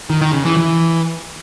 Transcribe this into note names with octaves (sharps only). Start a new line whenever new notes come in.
D#3
D#3
C#3
E3
E3